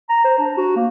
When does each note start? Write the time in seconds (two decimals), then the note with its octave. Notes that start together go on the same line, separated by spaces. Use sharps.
0.09 A#5
0.25 C5
0.39 D4
0.57 F#4
0.76 A#3